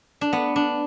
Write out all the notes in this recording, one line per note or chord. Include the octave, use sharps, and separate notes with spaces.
D4
B3
D4